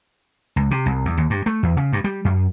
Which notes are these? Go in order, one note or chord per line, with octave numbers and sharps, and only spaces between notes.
C#2
C3
C2
E2
D#2
G2
A3
E2
C#3
G2
G3
F#2